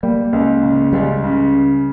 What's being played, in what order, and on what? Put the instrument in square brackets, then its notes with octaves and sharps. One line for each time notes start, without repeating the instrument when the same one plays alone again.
[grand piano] G3 [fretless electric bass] A#3
[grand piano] C#2
C#3
[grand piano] C#2 [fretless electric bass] G3
[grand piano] C#3